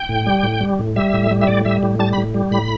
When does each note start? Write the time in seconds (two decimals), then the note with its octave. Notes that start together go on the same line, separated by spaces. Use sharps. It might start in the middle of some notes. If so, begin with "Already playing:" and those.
Already playing: G5
0.09 A2
0.26 G3
0.43 A2
0.61 G3
0.79 A2
0.96 G3 E5
1.13 A2
1.31 G3
1.41 E5
1.47 A2 D5
1.65 G3 E5
1.83 A2
1.99 G3 A5
2.13 B5
2.18 A2
2.34 G3
2.51 A2 B5